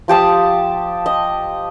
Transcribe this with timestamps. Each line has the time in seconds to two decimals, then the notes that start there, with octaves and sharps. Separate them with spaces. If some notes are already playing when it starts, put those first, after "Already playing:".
0.08 F3 G4 A5 D#6
1.06 D#5